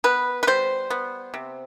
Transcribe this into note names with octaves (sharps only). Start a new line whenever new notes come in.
B3 B4
B4
G3 C5
B3
C3